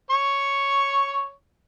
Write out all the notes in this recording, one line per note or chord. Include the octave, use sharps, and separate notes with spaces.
C#5 C#6